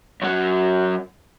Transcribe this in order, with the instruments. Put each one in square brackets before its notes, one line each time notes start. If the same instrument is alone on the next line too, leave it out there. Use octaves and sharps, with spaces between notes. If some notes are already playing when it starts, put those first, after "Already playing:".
[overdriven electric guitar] F#2 F#3